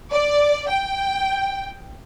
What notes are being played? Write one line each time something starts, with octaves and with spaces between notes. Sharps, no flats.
D5
G5